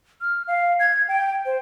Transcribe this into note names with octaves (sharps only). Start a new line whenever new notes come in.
F6
F5
G#6
G5
C5